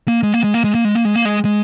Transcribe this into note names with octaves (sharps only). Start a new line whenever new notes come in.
A#3
G#3
A#3
G#3
A#3
G#3
A#3
G#3
A#3
G#3
A#3
G#3
G#3